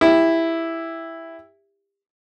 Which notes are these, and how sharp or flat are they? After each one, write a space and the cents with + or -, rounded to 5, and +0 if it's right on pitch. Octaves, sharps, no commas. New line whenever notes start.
E4 +0 G4 +25